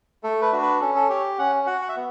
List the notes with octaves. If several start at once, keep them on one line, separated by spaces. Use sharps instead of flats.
A3 A4
B4
D4 F#4
B4
C#4 A4
A4
G4 C#5
C#4 F#5
F#4 F#5
F#5
E5
B3